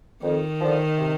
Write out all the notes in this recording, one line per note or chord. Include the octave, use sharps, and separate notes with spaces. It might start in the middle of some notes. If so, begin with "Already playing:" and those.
F2 D#3
D3 F3
C3